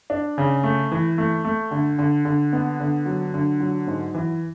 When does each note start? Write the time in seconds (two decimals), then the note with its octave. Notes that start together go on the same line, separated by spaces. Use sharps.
0.10 D4
0.38 C#3
0.63 A3
0.92 E3
1.18 A3
1.45 A3
1.71 D3
1.98 D3
2.25 D3
2.53 B3
2.80 D3
3.06 F#3
3.34 D3
3.60 F#3
3.87 G#2
4.15 E3